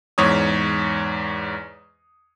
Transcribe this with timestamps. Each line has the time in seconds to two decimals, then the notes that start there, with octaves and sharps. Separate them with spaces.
0.18 E2 G#2 C#5 D#6